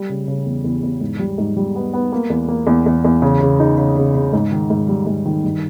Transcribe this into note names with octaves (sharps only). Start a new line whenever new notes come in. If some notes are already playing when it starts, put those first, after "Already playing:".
Already playing: G3
C#3
C#3
E2
E2
E2
G#2
G3
G#2
G3
B3
B3
A#3
E2
A#3
E2
E2
E2
C#3
C#3
D#4
C#3
C#3
C#3
G#2
D#3
G#2
G3
G#2
D#3
G2